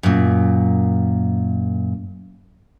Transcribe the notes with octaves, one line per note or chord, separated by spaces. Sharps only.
F#2 A#2